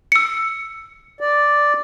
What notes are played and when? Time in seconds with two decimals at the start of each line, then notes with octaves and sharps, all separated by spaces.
0.12 E6 C#7
1.20 D5